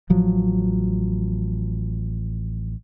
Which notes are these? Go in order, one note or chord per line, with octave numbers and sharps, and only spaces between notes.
A1 F3 F#3